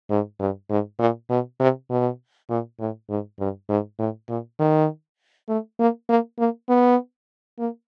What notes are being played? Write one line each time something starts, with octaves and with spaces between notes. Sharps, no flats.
G#2
G2
G#2
A#2
B2
C3
B2
A#2
A2
G#2
G2
G#2
A2
A#2
D#3
A3
A#3
A#3
A#3
B3
A#3